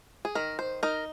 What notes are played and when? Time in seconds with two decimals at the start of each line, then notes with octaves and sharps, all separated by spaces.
0.25 G#4
0.35 D#3 A#4
0.59 C5
0.83 D#4 A#4